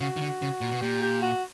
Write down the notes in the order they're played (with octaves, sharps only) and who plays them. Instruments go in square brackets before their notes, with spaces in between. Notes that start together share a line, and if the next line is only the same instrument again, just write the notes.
[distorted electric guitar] C#3 [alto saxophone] F#4
[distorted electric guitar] D#3
D3
C#3
A#2
B2
[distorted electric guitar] A#2 [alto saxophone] G4
[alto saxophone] G4
F#4